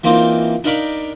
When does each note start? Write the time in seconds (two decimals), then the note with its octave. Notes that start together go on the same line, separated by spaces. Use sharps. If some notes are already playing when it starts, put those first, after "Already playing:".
0.04 E3 A#3 C4 D#4 F4
0.64 D4 D#4 A#4 F5 B5 D6